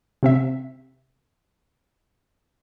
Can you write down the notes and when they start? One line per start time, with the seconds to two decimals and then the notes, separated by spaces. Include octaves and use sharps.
0.23 C3 C4 E5